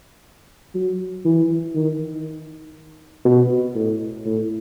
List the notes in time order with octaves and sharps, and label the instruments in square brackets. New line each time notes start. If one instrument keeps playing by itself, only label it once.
[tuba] F#3
E3
D#3
B2
A2
A2